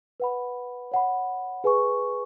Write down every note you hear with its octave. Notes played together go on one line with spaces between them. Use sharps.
B4 F#5 B5
C#5 F#5 B5
G#4 B4 G#5 C#6